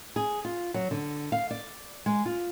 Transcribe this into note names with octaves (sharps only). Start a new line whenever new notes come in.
G#4
F4
F#3
D3
F5
D5
G#3
F4